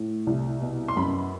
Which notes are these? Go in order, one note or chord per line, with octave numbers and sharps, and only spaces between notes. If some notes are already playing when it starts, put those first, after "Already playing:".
Already playing: A2
C2
B2
C6
F#2 B5